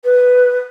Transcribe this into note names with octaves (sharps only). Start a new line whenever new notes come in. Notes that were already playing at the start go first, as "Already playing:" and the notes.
B4